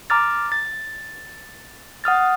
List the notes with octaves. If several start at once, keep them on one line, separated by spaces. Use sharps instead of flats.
A#5 D6 F6 A6
A6
F#5 D#6 F6 A6